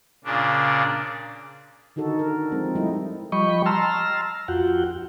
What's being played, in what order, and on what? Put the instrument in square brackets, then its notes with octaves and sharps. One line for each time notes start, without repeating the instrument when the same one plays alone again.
[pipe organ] A#2 C#3 D4
[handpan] D3 D#3 D#4 F#4 A4
A#4
F3 G#3 C4
G3 A3 D#4 E4
[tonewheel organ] F3 G3 D#5 G5 B5 C#6
A5 A#5 C6 E6 F6
F2 F4 F#4 F#5 G5